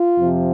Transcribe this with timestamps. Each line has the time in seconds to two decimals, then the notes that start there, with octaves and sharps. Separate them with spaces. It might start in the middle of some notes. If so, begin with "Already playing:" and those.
Already playing: F4
0.17 F2 C3 F3